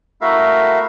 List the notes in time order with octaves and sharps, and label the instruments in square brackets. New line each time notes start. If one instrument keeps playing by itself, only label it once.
[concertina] A3 E4 F#4 A#4 E5 F5